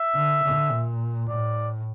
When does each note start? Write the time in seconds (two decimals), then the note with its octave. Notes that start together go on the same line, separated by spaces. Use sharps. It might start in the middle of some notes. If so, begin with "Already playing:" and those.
Already playing: E5
0.15 D3
0.43 D3
0.71 A#2
1.29 A2 D5